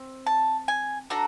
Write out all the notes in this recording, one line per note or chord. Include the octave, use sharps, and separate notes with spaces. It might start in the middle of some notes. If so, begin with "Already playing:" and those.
Already playing: C4
A5
G#5
D4 F#4 A4 A#5